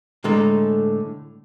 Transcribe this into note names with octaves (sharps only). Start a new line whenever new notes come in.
A2 D3 G#3 A4 A#5